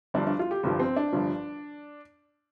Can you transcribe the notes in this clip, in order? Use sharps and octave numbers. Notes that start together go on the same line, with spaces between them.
G1 G2 F3 D4
D4
F4
G4
G1 G2 F3 G4
C4
D4
G1 G2 F3